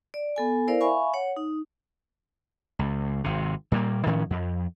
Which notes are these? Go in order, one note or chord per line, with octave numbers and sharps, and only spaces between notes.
D5
B3 A4 G#5
E4 A#4 C5 D5 F5
E5 F5 G#5 B5 C#6
C#5 F#5
D#4
C#2
G#1 C3
A#2 G3 A3 A#3
A2 D#3 F3 C#4
F2